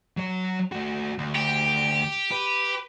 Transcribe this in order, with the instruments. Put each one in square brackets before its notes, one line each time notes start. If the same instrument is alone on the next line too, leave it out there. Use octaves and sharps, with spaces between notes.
[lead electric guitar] F#3 C#5
A3 F#4
D2
[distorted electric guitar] G4
[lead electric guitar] B4